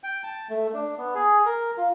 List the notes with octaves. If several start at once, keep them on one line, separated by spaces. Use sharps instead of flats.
G5
A5
A3
D4
B3
G#4
A#4
F4